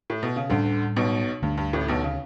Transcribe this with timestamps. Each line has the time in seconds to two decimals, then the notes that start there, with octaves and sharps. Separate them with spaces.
0.10 A2
0.23 B2
0.36 C#3
0.50 D2 A2 D3 G3 C#4
0.96 B1 B2
1.42 D2 G2 D3 A3 D4
1.57 G2
1.73 A1 A2
1.88 B1 B2
2.04 C#3